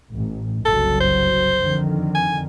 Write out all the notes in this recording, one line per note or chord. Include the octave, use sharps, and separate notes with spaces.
A1
F#1 C2 F#3 A4
C5
F2 D3 D#3
G#5